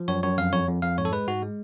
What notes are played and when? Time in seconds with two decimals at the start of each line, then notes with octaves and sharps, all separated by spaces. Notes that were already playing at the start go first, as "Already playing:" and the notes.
Already playing: F3
0.08 F#2 C#5
0.23 F#2 C#5
0.38 F2 F5
0.53 F2 C#5
0.68 F2
0.82 F2 F5
0.98 G#2 C#5
1.05 A4
1.12 G#3 B4
1.27 G#2 F#4
1.43 G#3